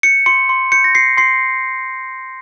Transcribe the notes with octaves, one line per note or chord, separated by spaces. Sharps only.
G6 C#7
C6 C#7
C6
G6 C#7
A#6
G6 C7
C6 C7